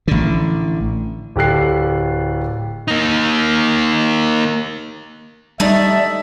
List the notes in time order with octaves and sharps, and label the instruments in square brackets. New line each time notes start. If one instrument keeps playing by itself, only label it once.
[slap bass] A1 D3
[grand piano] D1 G4 A4 F#6 C7
[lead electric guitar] A#3 D#4
[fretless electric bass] G3 [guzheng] A3 D#4 [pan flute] D5 [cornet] E5